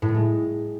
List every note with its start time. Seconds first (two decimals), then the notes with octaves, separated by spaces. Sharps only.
0.02 A2
0.08 A3
0.14 G#3